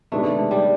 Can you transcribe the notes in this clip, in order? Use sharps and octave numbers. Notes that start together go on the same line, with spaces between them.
C3 D#3 G#3 A3 B3 D4
G3